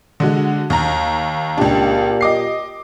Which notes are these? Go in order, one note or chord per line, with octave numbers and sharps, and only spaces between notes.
D3 G#3 F#4
D#2 A#5
C#2 A#2 D4 G4
D#5 D6 C7